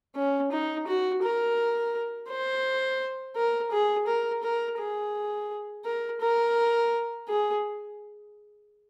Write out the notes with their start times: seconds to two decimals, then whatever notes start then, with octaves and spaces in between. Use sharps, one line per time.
0.15 C#4
0.52 D#4
0.87 F#4
1.23 A#4
2.29 C5
3.36 A#4
3.72 G#4
4.07 A#4
4.44 A#4
4.79 G#4
5.85 A#4
6.21 A#4
7.28 G#4